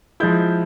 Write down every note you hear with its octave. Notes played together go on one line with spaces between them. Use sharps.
F3 G#3 E4 G6